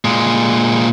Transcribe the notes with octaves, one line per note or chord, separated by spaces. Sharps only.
A#2 G#3